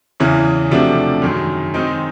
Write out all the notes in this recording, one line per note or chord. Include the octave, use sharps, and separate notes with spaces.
E2 C#3 E3
C3 F3 A3 D4 F#4
F#2 D#3 G#3
D#3 G#3 C4 D#4